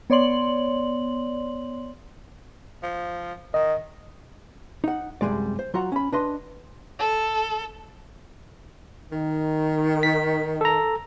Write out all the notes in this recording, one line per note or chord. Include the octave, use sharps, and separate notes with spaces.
B3 C#5 D5 C6 F#7
F3
D#3 D#5
D#4 F#5
C2 F#2 C#3 G3 G#3 D5
C5
F#3 F4 F#4 F#5 A#5
C#4 B5
D4 B4 D#5 C6
A4
D#3
B6
A4 A#5